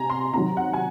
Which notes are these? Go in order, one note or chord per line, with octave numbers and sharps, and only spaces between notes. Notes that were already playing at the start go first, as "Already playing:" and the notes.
Already playing: C3 G#5 A#5
C6
C3 D#3 F#3 A#5
F#5
G#5